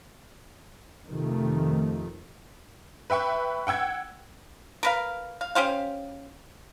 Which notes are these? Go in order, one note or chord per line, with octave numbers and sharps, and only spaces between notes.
F2 C3 D#3 F3 A3
B4 E5 G5 C#6
F#5 G5 E6 G#6
A#4 B4 F5
F5
C#4 G4 C5 F5